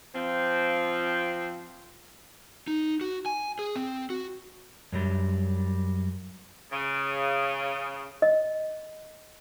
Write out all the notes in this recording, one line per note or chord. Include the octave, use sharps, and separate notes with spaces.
F3 C4
D#4
F#4
G#5
G#4
C4
F#4
F#2 F#3 G3
C#3
D#5